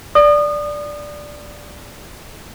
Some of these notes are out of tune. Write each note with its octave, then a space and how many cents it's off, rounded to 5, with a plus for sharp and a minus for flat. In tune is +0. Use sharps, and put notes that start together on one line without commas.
D5 +0 D#6 -30